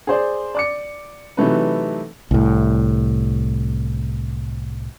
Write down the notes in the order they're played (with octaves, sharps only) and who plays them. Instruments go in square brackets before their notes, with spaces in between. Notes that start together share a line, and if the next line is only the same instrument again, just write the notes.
[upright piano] G#4 C5 D5
D5 D6 C#7
C3 E3 F#3 A3 D#4 B4
[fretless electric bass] C2 A2